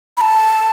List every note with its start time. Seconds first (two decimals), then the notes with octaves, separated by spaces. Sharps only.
0.17 B5
0.21 A5